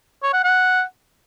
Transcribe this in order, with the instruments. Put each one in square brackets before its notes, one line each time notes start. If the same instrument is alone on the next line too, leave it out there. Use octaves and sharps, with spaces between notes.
[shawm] C#5
F#5
F#5